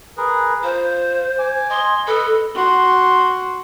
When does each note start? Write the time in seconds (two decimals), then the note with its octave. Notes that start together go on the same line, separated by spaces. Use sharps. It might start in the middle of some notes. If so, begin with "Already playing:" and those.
0.18 G#4 A#4 B4
0.64 F4 C5
1.39 G#5 D6
1.70 D#5 G#5 C6
2.07 A4 B4 D#5
2.55 F#4 C6